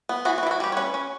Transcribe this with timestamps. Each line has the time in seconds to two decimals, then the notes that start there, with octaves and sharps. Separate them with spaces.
0.09 B3
0.25 E3 F#4
0.38 F#4
0.43 E3 E4
0.51 F#4
0.60 G3 G4
0.72 C#5
0.77 C#4 B4
0.94 C#4